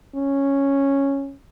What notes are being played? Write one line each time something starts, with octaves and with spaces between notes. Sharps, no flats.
C#4